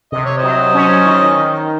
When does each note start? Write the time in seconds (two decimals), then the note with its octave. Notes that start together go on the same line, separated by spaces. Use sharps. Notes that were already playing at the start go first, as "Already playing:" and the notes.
0.12 C3 D#5
0.25 C#5
0.38 C5 D#5
0.43 F#3
0.74 C#4
1.06 D#3
1.37 D#3